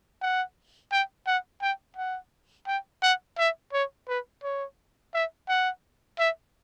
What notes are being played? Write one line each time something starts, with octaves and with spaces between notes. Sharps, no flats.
F#5
G5
F#5
G5
F#5
G5
F#5
E5
C#5
B4
C#5
E5
F#5
E5